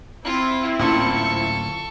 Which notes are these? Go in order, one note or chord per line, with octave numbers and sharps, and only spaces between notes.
C4 E4 F4
D1 A#2 C#4 A4 C#6